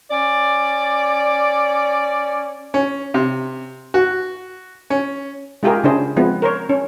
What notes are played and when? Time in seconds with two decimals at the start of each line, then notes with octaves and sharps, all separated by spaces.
0.11 C#4 D5
2.74 C#4
3.14 C3
3.94 F#4
4.90 C#4
5.63 G#3 E4 F4 G4 G#4 A#4
5.84 C#3 D4 E4 G#4 C5
6.16 F3 G#3 B3 C4 E4
6.42 A#4 C5 C#5
6.69 C#4